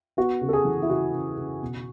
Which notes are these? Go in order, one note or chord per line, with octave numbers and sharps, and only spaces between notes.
B3 F#4
C#3
A4
G#4
E3
E4
C#3 F#4
C#3
C#3
B2